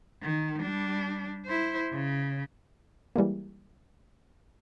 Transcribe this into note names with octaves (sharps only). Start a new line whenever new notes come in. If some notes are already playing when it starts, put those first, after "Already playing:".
D#3
G3 D4
E4 C5
C#3
E3 G3 G#3 A#3